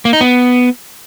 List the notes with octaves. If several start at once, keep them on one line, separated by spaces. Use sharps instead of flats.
A#3
D#4
B3